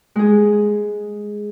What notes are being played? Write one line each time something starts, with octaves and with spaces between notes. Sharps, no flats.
G#3 G#4